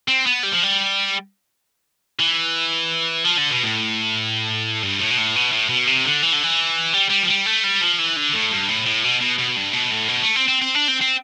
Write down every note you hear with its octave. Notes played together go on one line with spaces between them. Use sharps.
C4
B3
G3
F3
G3
E3
F3
D3
B2
A2
G2
A2
B2
A2
B2
A2
B2
C3
D3
E3
D3
E3
G3
G3
F3
G3
A3
G3
F3
E3
D3
A2
G2
A2
A2
B2
B2
B2
G2
B2
A2
B2
A3
C4
C4
C4
D4
C4
C4